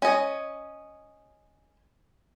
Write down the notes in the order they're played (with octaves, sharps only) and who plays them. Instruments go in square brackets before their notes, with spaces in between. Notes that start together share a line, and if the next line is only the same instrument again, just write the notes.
[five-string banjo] C#4 D#5